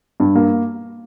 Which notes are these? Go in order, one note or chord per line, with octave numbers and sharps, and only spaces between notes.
G2
A#3